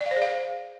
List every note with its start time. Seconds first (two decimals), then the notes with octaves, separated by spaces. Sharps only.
0.01 D5
0.06 F5
0.11 C5
0.16 G#4
0.22 F5